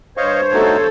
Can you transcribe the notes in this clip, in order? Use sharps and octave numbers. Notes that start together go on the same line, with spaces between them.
G2 C5 C#5 D#5 F5 C#6
A3 D#4 F#4 A4